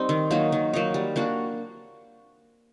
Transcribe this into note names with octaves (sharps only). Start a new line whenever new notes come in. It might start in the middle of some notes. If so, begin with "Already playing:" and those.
Already playing: G3 C4 D#4
D#3
F#3 A#3 D#4
D#3
F#3 A#3 D#4
G3
A#3 D4 F#4